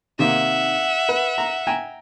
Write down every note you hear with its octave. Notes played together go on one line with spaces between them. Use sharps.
C3 D#3 A#3 E5 F#5
B4
A#5
G5 G#5 A#5